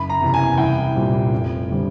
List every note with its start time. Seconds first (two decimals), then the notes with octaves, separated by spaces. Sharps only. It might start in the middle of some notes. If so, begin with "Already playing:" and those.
Already playing: F#1 B5
0.10 A#5
0.21 E2 C3
0.34 G#5
0.58 C2 G5
0.95 A#2 G3 C4
1.33 F1
1.70 D3 G3 C4